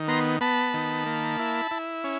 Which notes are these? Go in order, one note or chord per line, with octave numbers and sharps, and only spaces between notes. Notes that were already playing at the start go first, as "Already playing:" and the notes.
Already playing: D#3
B3 A#5 C6
B3 A5 B5
D#3
A#3
E4
E4
C#4